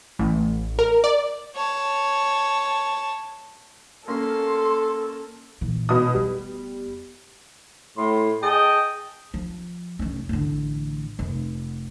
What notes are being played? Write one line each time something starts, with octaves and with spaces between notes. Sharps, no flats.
A1
A#4
D5
C#5 A5
A#3 C#4 A4 C6
A#2 E3
B2 D#6
F1 G3 B3
A2 C6
G#4 D#5 G5 A5
F3
F1 C#4
A1 D3
F1